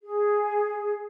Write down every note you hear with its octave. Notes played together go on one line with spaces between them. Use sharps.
G#4